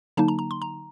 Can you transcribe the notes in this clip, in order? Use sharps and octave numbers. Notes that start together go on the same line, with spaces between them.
D3 F#3 A#3 D#4 A5
A#5
A#5
C6
A#5